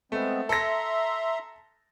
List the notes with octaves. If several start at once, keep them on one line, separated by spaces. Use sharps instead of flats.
G#3 A3 B3 C4
A4 E5 A#5 C6 A#6